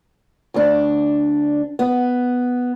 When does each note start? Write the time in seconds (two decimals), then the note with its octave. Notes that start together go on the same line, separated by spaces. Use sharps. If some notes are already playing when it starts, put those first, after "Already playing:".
0.54 D2 D4
1.79 B3